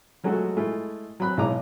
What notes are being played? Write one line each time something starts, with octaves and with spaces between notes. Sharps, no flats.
F3 F#3 G#3 A3 F#4 A4
G#3 A3 E4 F4
F#3 C4 B5 F#6
B1 E3 G#3 D#5 A#5 D6